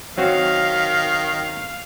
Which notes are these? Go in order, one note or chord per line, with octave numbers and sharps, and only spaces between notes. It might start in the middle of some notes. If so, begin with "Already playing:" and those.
D#3 F#3 C4 F#4 F5